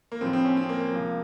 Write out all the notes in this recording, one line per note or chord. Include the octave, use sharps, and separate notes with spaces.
A#3
A1 A2 F3 C4
C4
C#4
C4
A#3
A#3
C#2 C3 F3